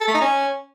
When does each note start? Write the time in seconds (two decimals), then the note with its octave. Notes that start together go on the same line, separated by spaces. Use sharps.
0.01 A4
0.07 A3
0.14 D#4
0.21 C#4